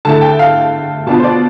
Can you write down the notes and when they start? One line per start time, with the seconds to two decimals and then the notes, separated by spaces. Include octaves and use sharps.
0.05 D3 A3 E4 A5
0.22 G5
0.39 F5
1.06 B2 B3 D4 F4 A5
1.20 C5
1.24 D5